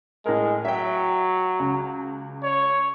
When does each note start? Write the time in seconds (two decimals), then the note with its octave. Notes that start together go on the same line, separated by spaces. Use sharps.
0.26 A2 G#3 A#4
0.65 F#3 E5 G5
1.60 C#2
2.43 C#5